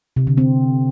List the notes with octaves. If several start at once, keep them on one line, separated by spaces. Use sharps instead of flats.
C3
D3
C4